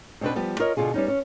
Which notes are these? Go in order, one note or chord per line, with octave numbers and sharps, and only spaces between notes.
B2 C4 D4 B4
F3 G3 B3
F4 A#4 C#5 D#5
B2 D3 F4 G#4
G3 B3 C#4 D#4
C#4